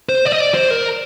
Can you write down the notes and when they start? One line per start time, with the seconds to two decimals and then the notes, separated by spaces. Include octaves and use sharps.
0.09 C5
0.25 D5
0.32 D#5
0.40 D5
0.55 C5
0.71 A#4